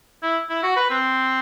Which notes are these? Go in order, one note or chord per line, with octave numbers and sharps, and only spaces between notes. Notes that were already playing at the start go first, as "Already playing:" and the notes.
E4
E4
F#4
B4
C4